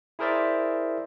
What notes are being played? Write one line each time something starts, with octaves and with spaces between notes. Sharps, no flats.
E4 G#4 A#4 C5 D5 E5